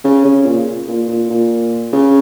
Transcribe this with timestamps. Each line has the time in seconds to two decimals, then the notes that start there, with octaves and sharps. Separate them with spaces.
0.04 C#3
0.24 C#3
0.46 A#2
0.88 A#2
1.08 A#2
1.30 A#2
1.93 C#3